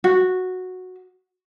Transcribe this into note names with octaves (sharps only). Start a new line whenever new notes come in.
F#4